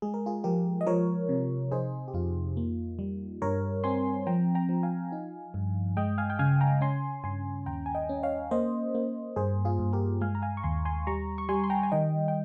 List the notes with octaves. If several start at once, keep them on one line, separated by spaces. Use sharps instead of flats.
G#3 G#4
A#4
F4 G#4
F3 G4 A#4
D#5
F3 A#4 C#5
C3
D#4 G#4 C5
G4
F2 F4
A#3
G3
G2 A#4 C#5
C4 G#5 C6
F3 G5 A#5
G5 A#5
F3
F5 G#5
D#4
G2
G#3 D#5 G5
F5 G#5
G5
C#3 F5 G#5
G5 A#5
C#4 G#5 C6
G2 G#5 C6
D#2 G5 A#5
G#5
D#5 G5
C#4
C#5 F5
A#3 C5 D#5
A#3
G2 G#4 C5
F4 G#4
G2
G4 A#4
G#3 F5 G#5
A#5
F5 G#5
C#6
D#2 G#5 C6
G#5 C6
G3 A#5 C#6
C#6
G3 G#5 C6
C6
G5 A#5
G#5
D#3 D#5 G5
G5